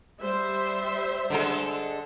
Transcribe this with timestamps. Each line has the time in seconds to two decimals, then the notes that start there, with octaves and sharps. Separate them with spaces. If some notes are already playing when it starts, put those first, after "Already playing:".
0.21 G3 C5 E5
1.30 D3 G#3 A4